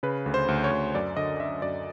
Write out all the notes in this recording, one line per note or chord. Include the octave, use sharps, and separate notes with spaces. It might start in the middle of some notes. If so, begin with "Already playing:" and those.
C#3 B4
D2
C5
D2
C#5
D2
F#2 D5
D3 D#5
D3 E5
F#2 D5